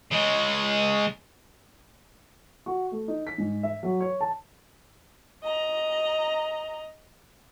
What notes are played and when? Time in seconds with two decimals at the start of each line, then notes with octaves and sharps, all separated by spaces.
0.11 C#3 G#3
2.66 F#4
2.91 A3
3.08 D#4
3.27 B6
3.38 G#2
3.63 E5
3.83 F#3
4.01 C#5
4.21 A5
5.43 D#5 A#5